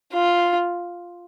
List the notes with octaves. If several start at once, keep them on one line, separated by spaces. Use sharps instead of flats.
F4